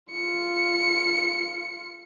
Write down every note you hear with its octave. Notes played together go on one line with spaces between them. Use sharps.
F4 C#7